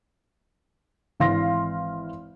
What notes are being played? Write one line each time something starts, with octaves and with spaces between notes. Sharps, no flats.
G#1 E3 F5 C6 A#6